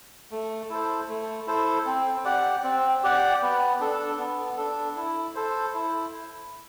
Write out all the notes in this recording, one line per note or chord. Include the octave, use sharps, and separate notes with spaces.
A3
E4 A4 C5
A3
E4 A4 C5
C4
G4 D5 F#5
C4
G4 D5 F#5
B3
D4 A4
B3
D4 A4
E4
A4 C5
E4